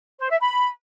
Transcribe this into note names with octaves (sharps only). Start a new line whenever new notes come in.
C5
E5
B5